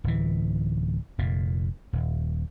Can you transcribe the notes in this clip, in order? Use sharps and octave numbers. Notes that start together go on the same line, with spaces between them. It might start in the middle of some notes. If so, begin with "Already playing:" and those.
D1 E3
F1 A#2
D#1